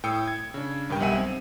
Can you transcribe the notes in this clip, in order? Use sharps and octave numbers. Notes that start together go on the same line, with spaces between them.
A2 G5 D#6 E6 C#7
G#6
C#3 D4
G#1 G2 A#4 G5
B1 G3 E5 F#5 G#5 D#7
C4